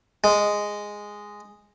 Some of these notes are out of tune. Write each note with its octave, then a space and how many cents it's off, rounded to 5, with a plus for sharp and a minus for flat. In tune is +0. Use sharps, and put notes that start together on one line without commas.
G#3 -5